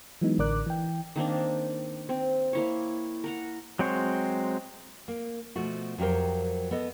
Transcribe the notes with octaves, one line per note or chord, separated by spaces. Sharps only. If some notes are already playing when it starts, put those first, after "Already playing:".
E3 F#3 G#3 B3 D#4
A1 D3 A#4 D5 D6 F#6
E3 G5
D#3 A#3 C4 D4
C4
A#3 E4 C#5
A#4 F#5 A#5
F#3 G#3 C4 C5 C#5
A#3
B2 F3 A3 F#4
F2 F#3 G4 A#4 C5
B3 A4 D#5